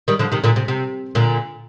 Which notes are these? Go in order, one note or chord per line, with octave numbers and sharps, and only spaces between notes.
D#3 G3
D3 F3
C3 D#3
A#2 D3
C3
C3
A#2 D3